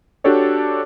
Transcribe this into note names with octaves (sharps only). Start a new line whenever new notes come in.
D4 F#4 G4 A4 C#5 D5